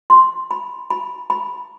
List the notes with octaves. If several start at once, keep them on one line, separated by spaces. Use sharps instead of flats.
C6
B5
B5
B5